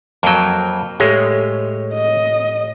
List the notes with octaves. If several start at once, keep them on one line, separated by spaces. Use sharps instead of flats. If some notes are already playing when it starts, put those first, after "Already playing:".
F2 F#3 A#3 G5
A2 G#3 G4 C#5
D#5